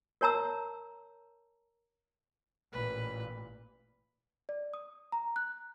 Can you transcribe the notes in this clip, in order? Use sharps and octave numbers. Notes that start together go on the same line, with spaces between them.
A#4 C#5 A5 A#5 E6
A1 A#2 B4
D5
D#6
A#5
F#6